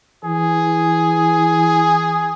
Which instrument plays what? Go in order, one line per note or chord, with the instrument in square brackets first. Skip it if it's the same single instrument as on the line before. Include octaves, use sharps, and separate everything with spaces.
[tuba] E3 [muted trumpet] G#4